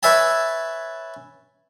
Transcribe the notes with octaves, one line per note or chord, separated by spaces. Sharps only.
B4 C#5 E5 G#5 A5